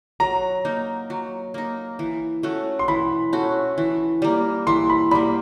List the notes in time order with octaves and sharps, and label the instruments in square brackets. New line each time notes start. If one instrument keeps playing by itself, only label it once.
[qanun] F#3 [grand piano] A#5
[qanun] A#3 D#4
F#3
A#3 D#4
E3
A3 C#4 F#4
[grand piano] C6
[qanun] E3 [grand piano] B5
[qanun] A3 C#4 F#4
E3
G3 A#3
[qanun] E3 [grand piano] C6
[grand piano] B5
[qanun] G3 A#3 [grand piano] B5